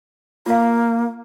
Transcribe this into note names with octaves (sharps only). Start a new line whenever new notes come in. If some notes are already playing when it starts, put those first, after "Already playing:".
A#3 F4 F5